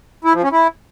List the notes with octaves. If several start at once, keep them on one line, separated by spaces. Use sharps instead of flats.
E4
F3
C#4
E4